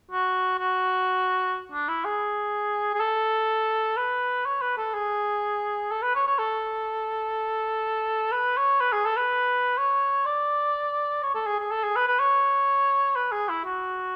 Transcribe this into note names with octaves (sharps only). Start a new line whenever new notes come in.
F#4
F#4
D4
E4
G#4
G#4
A4
B4
C#5
B4
A4
G#4
A4
B4
C#5
C#5
A4
B4
C#5
B4
G#4
A4
B4
C#5
D5
C#5
A4
G#4
G#4
A4
G#4
B4
B4
C#5
B4
G#4
E4
F#4